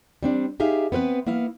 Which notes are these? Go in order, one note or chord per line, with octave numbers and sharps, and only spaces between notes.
G3 C4 D4
D#4 G4 G#4 E5 F5
B3 C4 A#4 B4
A#3 B3 E4 F5